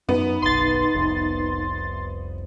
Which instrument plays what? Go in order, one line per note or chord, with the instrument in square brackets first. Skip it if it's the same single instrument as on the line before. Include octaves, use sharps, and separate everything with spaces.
[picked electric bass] F#2 [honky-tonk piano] B3 [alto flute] D#4
[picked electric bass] F#1 B1 [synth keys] C6 A6
[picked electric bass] F1 C2